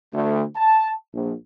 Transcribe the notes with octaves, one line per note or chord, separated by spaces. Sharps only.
D2
A5
A#1